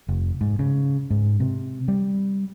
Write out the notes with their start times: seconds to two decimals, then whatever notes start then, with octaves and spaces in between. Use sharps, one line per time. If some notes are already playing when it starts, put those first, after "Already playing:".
0.08 F1
0.41 G#2
0.59 C#3
1.10 G#2
1.40 C3
1.88 G3